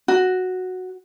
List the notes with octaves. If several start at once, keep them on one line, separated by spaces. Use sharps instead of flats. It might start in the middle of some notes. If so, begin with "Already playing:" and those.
F#4